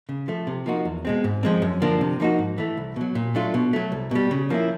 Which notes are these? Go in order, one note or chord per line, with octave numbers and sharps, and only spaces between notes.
C#3
F3 A3
C3
F3 A#3 D#4 F#4
E2
B2 G#3 C4
G#2
F3 G#3 C4
F#2
D3 F3 A#3 D4
C3
F3 A#3 D#4 F#4
G#2
E3 A3
C2
B2 F#3
A#2
F#3 A3 D4 F4
B2
F#3 A3
C2
B2 G3
C#3
F3 A#3 C#4 E4